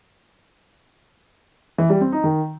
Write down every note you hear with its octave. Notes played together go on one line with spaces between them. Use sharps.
E3
G3
C4
D#4
D#3